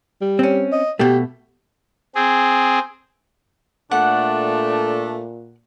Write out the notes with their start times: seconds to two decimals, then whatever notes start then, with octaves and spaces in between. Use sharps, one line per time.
0.21 G3
0.39 C4 C#4
0.72 D#5
0.99 B2 A3 G4
2.15 C4 G#4
3.91 A#2 A3 D4 F#5